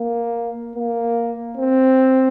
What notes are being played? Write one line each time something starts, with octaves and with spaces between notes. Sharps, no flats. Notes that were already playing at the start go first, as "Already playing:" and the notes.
Already playing: A#3
A#3
C4